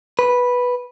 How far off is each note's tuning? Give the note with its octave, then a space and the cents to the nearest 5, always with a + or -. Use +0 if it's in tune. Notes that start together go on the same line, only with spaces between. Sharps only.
B4 -5